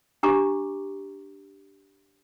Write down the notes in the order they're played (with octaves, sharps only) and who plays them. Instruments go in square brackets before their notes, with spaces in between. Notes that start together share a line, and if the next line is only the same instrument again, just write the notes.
[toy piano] D4 G4 A#5 C#6 D6